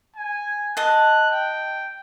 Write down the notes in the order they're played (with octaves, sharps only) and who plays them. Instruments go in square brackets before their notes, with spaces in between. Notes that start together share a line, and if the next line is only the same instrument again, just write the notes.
[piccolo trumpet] G#5
[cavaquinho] D#5 A5 [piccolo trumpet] F#6
[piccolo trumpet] G5